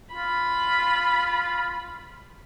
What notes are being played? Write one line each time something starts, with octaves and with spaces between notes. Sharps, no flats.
F4 B5